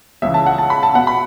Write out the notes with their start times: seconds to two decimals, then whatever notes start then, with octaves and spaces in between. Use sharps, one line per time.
0.22 C#2 C#3 E3 E5
0.34 A5
0.46 F#5
0.58 A5
0.70 B5
0.83 A5
0.94 B2 B3 F#5
1.07 B5